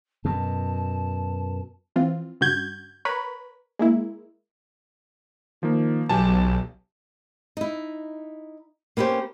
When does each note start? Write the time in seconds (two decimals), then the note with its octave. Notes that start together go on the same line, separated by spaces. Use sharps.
0.25 F#2 B2 A5
1.96 E3 F3 C4 F4
2.41 G2 C#3 F#4 G6 G#6
3.05 A#4 B4 C#5 B5
3.79 G#3 A#3 E4
5.63 D#3 F3 A#3
6.09 B1 F#3 G4 G#5 A5
7.57 D#4 E4
8.97 A#3 B3 C#4 G4 C5